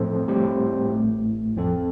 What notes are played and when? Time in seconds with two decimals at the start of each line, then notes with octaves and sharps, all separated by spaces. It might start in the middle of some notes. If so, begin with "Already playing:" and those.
Already playing: A2 F3 C4 A4 C5
0.28 A2 G3 C4 G4 C5
0.92 A1 A2 A3
1.56 F2 F3 C4 A4